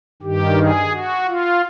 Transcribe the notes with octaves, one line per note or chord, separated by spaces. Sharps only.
G2 D#3 G4
G#4
F#4
F4